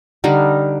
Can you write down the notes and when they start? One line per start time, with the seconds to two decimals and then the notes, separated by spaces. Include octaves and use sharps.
0.24 D3 G3 D#4 A#4